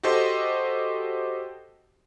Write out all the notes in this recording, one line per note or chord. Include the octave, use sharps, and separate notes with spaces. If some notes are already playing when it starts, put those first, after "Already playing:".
F#4 G4 A4 C5 D#5